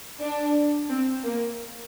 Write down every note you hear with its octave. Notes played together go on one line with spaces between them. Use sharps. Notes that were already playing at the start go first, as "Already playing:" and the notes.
D4
C4
A#3